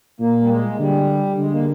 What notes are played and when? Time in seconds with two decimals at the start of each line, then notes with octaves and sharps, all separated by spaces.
0.20 A#2 A#3
0.41 G3
0.50 G#3
0.79 D3 G3
1.38 D3 G#3
1.52 A#3